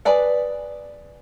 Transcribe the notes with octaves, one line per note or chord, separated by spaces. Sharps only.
G#4 B4 D5 F#5